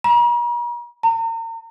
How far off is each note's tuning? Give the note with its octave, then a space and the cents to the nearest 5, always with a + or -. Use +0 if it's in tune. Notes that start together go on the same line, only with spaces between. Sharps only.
A#5 +45
A#5 -40